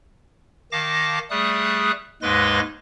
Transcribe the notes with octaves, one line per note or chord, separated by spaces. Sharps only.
D#3 F5 A5 D6 A#6
G3 A3 G#4 D#6 F#6
D#2 G#2 G#3 B4 C6 A#6